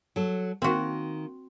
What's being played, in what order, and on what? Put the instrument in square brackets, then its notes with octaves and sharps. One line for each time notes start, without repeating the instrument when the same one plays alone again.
[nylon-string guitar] F#3 A4
[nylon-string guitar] D#3 A#3 [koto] C4 F#4